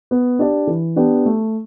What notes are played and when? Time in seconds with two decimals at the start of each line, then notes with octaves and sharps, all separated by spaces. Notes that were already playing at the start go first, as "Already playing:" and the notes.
0.11 B3
0.39 D4 G4 D5
0.67 E3
0.96 B3 D4 G4
1.25 A3